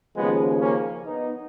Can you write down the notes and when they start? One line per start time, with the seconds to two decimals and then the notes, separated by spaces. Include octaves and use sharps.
0.15 D#2 C#3 F3 G#3 B3
0.60 A#3 C#4
1.04 B3 D#4